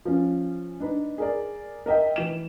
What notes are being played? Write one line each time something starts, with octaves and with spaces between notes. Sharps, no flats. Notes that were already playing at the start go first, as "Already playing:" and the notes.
F3 C#4
D4 D#4 B4
G#4 A#4 D5
A#4 D#5 E5 G5
E3 E7